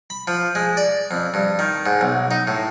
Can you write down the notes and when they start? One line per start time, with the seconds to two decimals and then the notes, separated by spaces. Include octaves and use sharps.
0.10 B5
0.27 F3
0.55 G#3
0.77 D5
1.11 F2
1.34 G2
1.59 D#3
1.86 G#2
2.01 B1
2.31 D#4
2.47 A2